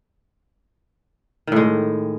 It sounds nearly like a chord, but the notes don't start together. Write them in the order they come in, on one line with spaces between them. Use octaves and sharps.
D#3 A2 G#3